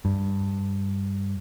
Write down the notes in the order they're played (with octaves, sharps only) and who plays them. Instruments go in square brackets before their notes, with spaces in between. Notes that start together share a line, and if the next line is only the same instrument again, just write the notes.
[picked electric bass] G2